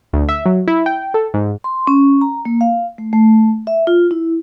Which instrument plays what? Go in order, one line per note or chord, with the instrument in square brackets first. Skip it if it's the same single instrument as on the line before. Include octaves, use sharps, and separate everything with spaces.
[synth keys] D2
E5
F#3
E4
G5
A4
G#2
[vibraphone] C6
C#4
A#5
A#3
F5
A3
A3
E5
F4
E4